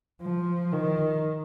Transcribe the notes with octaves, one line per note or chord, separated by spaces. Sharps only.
F3
D#3